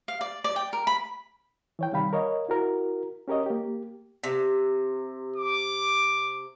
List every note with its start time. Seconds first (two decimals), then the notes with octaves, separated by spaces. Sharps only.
0.08 F5
0.21 D5
0.44 D5
0.56 G5
0.73 A#4
0.87 B5
1.79 E3 C#5 G5
1.92 C3 D#3 G3 F5 G5 B5
2.13 A#4 C#5 D#5 F5
2.49 E4 F#4 A#4
3.28 C#4 G4 A#4 C#5 D#5
3.46 A#3 G4
4.24 C3
5.36 D6